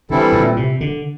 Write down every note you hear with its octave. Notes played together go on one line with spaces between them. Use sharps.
D3 E3 G3 C4 E4 A4
A#2
C3
D3